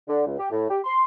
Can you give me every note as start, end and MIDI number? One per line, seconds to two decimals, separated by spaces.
0.08 0.23 50
0.26 0.37 37
0.38 0.48 67
0.51 0.67 45
0.69 0.80 67
0.84 1.03 84